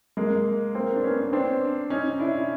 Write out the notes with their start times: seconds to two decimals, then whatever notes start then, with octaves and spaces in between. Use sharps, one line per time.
0.17 G#3 A#3
0.74 A#3 C4
0.96 D4
1.04 B3 C#4
1.33 C4 D4
1.90 C#4 D#4
2.19 D4 E4